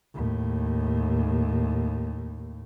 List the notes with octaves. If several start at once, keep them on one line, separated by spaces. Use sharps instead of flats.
D#2 A2